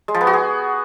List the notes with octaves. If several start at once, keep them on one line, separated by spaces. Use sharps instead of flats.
G#3
F3
B3
F#4
G#4